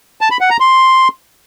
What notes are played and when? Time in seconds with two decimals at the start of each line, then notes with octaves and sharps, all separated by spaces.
0.21 A5
0.31 B5
0.41 F#5
0.50 A#5
0.60 C6